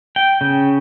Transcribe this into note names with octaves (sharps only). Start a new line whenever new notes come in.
G5
C#3